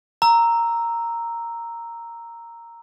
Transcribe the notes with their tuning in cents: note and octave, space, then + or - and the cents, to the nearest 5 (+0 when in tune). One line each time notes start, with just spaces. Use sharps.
A#5 -5 E6 +0